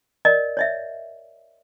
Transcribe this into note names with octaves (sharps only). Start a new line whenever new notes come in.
A#4 D5 D#5
C#5 D#5 E5